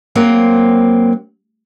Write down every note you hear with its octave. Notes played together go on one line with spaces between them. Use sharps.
F#3 A#3 C4